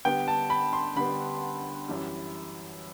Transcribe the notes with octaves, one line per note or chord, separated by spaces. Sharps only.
D3 G3 B3 G5
A5
B5
C6
D3 G3 B3 B5
F#2 E3 G3